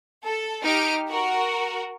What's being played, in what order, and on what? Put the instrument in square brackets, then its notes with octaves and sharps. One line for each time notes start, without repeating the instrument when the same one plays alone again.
[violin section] A4
D#4 G4 F6 D7
F#4 A#4